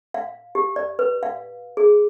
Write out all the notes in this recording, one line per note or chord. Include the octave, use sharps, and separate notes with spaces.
F5
G4
D5
B4
F5
G#4